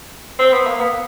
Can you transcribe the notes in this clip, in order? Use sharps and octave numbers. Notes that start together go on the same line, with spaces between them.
C4
B3
A#3
B3